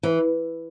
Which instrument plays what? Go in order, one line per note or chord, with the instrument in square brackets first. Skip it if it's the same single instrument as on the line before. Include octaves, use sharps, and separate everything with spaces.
[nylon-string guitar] E3